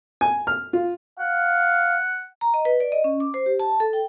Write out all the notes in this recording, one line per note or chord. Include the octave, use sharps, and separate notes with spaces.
G#5
F6
F4
F5 F#5
A#5
D#5
B4
D5
D#5
C#4
D6
C5
G4
A5
A4
G5